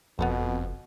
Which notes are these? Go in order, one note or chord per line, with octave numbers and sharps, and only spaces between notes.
F#1 F2 B2 B3 A4 A#4